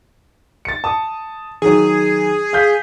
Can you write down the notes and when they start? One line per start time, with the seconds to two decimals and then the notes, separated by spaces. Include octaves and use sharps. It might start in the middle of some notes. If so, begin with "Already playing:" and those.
0.65 A6 C#7
0.84 A5 D#6
1.62 D#3 F#3 G#4
2.53 F5 G6 B6